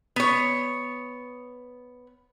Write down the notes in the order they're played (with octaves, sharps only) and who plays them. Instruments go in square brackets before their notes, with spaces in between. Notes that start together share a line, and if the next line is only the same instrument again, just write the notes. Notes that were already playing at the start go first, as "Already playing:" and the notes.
[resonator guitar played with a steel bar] B3 C#5